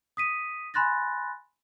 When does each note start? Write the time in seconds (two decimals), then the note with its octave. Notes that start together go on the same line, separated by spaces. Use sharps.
0.17 D#6 B6 D#7
0.74 G#5 B5 C6 F#6 A6 A#6